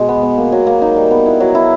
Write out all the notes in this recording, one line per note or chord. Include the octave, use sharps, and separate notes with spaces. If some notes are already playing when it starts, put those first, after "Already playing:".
Already playing: B2 G#3
B3
B3
A#3
F#3
A#3
D#4
G3
B3
E4
F#3
E4